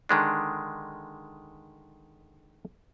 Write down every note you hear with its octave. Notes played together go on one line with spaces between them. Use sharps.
D3 D#3 G#3 D4